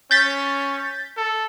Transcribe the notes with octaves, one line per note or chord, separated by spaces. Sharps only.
C#4 G6 A6 B6
A4